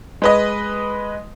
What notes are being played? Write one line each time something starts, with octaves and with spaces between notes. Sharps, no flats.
G#3 B4 D#5